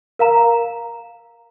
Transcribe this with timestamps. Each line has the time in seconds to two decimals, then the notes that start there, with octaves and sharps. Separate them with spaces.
0.19 A#4 F5 A#5